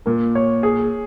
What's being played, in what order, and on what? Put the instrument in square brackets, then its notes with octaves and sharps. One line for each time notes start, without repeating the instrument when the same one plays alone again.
[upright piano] A#2 [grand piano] A#4
[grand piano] C#5
G#4